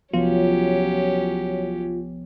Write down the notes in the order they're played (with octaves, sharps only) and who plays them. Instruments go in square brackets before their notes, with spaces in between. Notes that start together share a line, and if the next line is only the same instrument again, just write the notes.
[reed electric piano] C2 F3 B3 [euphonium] F#3 [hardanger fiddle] C#4 G4 [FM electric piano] F4